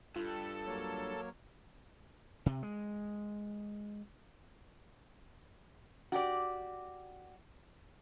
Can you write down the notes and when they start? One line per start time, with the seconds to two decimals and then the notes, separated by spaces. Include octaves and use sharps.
0.16 G2 F4 A4
0.66 F#3 A#3 C#5
2.46 C3
2.63 G#3
6.12 F#4 G4 D5